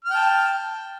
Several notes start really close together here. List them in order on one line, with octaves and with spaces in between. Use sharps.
F6 G5 A5